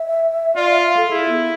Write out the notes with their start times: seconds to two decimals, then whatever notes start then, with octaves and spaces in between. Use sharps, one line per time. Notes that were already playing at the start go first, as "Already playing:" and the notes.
Already playing: E5
0.56 F4 D5
0.70 E5
0.84 F5
0.97 A4
1.11 E4 G#4
1.29 B3